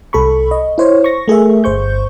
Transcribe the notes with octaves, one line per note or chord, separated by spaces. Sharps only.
C2 A4 B5 C#6
D#5
E4 C5 C#5
C#6 A#6
A3 G#4 A#4 E5
G1 C5 C#6 G6